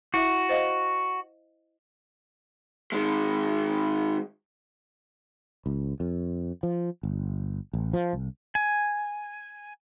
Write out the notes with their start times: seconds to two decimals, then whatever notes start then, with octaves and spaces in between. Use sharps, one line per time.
0.14 E4 F#4 E5
0.49 C5 D#5 F5
2.92 D#3 G#3
5.66 C#2
6.00 F2
6.63 F3
7.03 G1
7.73 A1
7.93 F3
8.13 C2
8.55 G#5